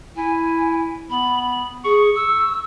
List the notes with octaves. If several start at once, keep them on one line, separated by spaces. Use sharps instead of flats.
E4 G#5
B3 B5
G#4 C#6
E6